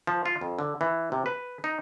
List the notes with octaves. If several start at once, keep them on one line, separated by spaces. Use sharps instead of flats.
F3
F4
F2
D3
E3
C3
B4
D#4